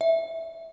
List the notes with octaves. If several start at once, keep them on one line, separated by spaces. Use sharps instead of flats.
E5